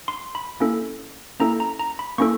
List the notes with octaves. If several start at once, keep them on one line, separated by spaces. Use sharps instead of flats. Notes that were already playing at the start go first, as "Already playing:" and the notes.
C6
B5
A#3 C#4 E4 A4
A#3 C#4 E4 A4 A#5
A#5
A#5
B5
A#3 C#4 E4 A4 C#6